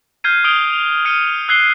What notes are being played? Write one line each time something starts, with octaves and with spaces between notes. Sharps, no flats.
F6 G6 G#6 C7 D#7
D#6 G6 D7 F7 G7
F7
F6 C#7 D#7
E6 F#6 G#6 C7 G7